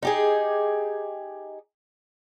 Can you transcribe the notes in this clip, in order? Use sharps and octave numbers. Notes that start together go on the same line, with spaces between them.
D#4 G4 G#4